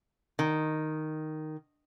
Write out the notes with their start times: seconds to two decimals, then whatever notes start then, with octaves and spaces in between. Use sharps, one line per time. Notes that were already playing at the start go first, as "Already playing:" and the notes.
0.39 D#3